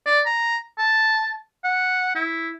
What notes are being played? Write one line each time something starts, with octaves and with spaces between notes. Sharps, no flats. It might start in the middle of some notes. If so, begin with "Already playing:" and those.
D5
A#5
A5
F#5
E4